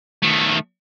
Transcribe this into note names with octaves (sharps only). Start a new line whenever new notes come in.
D#3 A3